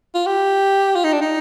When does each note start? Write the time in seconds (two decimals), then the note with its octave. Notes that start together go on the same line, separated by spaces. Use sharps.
0.15 F4
0.26 G4
0.95 F4
1.04 D#4
1.13 D4
1.21 D#4